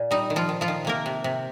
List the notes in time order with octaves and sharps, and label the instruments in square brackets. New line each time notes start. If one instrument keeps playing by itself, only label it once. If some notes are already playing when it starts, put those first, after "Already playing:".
Already playing: [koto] A#2
G3 D#4
D#3
F3 F4
D#3
F3 F4
D#3
C3 A#3 A#4
C3
C3